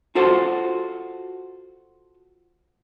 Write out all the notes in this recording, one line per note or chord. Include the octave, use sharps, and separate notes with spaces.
F4 F#4 A4 C5